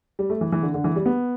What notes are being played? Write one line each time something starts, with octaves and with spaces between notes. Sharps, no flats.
G3
A3
E3
E3
D3
D3
E3
G3
B3